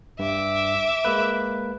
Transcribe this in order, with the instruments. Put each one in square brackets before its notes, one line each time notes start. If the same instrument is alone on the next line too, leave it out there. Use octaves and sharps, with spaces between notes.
[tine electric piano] G2 [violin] E5 D6
[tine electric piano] G#3 A#3 B4